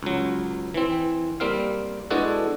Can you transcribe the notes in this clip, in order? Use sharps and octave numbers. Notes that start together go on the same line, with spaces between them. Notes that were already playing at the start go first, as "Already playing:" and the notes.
C#2 F#3
E3 C4
G3 A#3 C4 F5
G#3 B3 D4 E4 F#4 A4